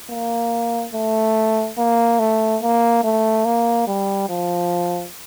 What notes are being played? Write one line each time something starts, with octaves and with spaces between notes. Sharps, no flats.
A#3
A3
A#3
A3
A#3
A3
A#3
G3
F3